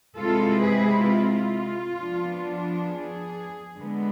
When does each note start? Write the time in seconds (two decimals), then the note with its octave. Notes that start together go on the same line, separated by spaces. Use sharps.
0.18 C3 G#3 C4 E4 F4 A4
0.63 G#4 B4
1.08 F4
1.98 F3 B3 D4
2.88 G#4
3.78 D3 G#3 B3